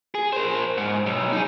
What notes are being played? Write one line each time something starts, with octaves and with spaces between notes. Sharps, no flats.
G#4
A#4 C5
G#2
B1
D#4 G#4